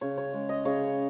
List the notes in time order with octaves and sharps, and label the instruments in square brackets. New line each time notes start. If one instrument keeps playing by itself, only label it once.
[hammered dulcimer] C#3 C#5
C#5
G#3
D#5
C#3 C#5